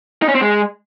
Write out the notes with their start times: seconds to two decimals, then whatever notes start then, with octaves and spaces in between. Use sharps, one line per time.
0.22 D#4
0.29 C#4
0.35 C4
0.41 G#3